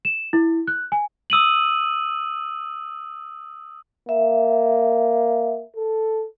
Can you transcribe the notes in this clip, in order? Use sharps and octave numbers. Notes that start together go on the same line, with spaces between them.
E7
E4
F#6
G#5
D#6 E6 D#7 F#7
A#3 E5
A4